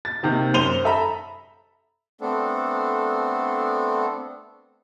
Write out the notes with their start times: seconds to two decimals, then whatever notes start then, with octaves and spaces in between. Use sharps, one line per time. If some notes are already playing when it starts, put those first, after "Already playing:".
0.05 A6
0.23 C3 D#3 A#3
0.54 F#2 C5 D#7 F7 G7
0.84 A4 E5 A#5 B5
2.21 A3 B3 C4 D4 A4